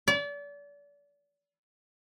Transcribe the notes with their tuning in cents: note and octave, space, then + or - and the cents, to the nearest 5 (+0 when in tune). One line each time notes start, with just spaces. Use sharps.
D5 -35